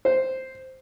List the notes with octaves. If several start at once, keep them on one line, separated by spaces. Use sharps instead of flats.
C5